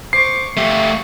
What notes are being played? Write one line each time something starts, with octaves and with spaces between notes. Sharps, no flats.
C5 C#6 D6 C7
A3 G4 E5 F5 C#6